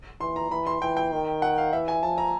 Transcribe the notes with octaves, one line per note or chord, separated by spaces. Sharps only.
E3 C6
A#5
E3 B5
C6
E3 G5
G5
D#3
F#5
F5
E3 E5
G#5
F3 A5
A#5